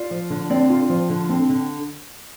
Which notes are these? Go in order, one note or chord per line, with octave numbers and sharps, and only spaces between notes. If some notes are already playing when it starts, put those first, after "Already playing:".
Already playing: F4 D5
F3
D3
C4 D5
F4
F3
D3
C4
D3